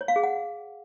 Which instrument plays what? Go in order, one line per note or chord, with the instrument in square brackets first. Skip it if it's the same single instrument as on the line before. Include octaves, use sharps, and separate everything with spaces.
[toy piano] C#5
F5
G#4
F#5